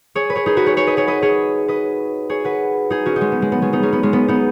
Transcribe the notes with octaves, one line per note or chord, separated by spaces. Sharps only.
G#4 C#5
B4
G#4 C#5
D#4 G#4
F#4 B4
G#4 C#5
G#4 C#5
B4 D#5
G#4 C#5
B4 D#5
G#4 C#5
B4 D#5
G#4 C#5
F#4 B4
D#4 G#4
C#4 F#4
D#4
G#3 C#4
B3
G#3
B3
G#3 C#4
B3 D#4
G#3 C#4
B3
G#3 C#4
B3
B3 D#4